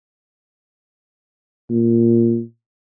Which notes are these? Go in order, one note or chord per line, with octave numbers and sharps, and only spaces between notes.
A#2